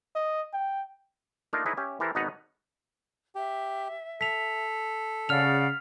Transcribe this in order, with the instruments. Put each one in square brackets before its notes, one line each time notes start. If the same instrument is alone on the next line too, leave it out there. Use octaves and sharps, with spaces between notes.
[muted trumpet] D#5
G5
[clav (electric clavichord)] A3 A#3 D4 D#4 F4 A#4
D#4 E4 G#4 B4 C#5 D#5
C#4 G4 E5
E3 G4 A4 A#4 C5
G#1 B2 B3 D#4 F#5 A#5
[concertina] G4 [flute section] E5
[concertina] A4 [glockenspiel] B6 F7
[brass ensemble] C#3 [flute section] D5 F5 F#5 [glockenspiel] F6 F7